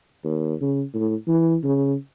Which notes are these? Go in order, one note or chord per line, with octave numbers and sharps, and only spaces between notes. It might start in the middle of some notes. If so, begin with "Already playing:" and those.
D#2
C#3
A2
E3
C#3